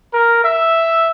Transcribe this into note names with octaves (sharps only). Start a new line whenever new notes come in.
A#4
E5